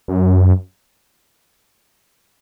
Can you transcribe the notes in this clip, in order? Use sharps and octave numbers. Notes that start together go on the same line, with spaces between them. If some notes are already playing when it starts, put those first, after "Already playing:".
F#2